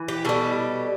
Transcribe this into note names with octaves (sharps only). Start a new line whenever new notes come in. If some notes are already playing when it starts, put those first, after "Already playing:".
Already playing: E3
G4
B2 G3 A4